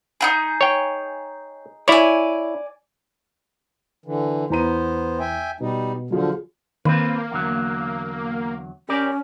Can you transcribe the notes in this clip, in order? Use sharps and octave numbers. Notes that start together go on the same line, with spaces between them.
D#4 E4 G#4
C#5 G5
E4 C#5 D5 G#5
D3 E3
E2 B3 C5 A#5 D#7
E5 G5 G#5
B2 G3 D#4
D3 F3 F#3 F4 G#4
D#3 A#3 C4 F4 B4
E2 D3 F#3
C#4 G4 A#4 D5